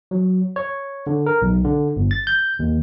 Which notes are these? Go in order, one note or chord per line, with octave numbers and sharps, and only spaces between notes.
F#3
C#5
D3
A#4
B1
D3
G1
A6
G6
D#2